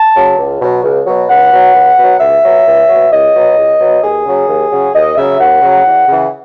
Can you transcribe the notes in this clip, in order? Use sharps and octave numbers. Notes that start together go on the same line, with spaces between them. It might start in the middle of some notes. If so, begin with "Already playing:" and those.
Already playing: A5
C#3 F#3
C#2
B2 F#3
C#2
B2 F#3
C#2 F#5
B2 F#3
C#2
B2 F#3
C#2 E5
B2 F#3
C#2
B2 F#3
C#2 D#5
B2 F#3
C#2
B2 F#3
D#2 G#4
C#3 F#3
D#2
C#3 F#3
D#2 D#5
C#3 F#3 E5
D#2 F#5
C#3 F#3
E2
C#3 E3